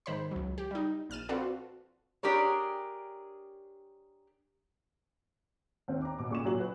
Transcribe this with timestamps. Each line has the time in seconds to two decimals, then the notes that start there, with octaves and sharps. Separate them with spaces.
0.06 G#2 D#3 C5 B5
0.31 C#2 F#3
0.58 G4
0.71 G3 D#4
1.10 A#1 F6 A6 D#7 E7
1.29 C4 F4 F#4 A4 B4 D5
2.23 D4 G4 G#4 A#4 C#5
5.88 D#2 C4
6.02 A#5 D6
6.18 B2 D6
6.30 A#2 C#3 C#6 D6 E7
6.44 A#2 F#3 F#4 F#7
6.60 B4